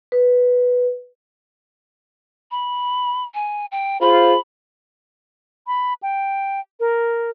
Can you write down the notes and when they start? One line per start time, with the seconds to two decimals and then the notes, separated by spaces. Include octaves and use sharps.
0.12 B4
2.51 B5
3.34 G#5
3.71 G5
4.01 F4 G#4 C5 B5
5.67 B5
6.03 G5
6.80 A#4